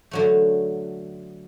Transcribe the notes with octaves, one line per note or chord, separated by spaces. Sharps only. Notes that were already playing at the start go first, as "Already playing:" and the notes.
D3 F#3 A3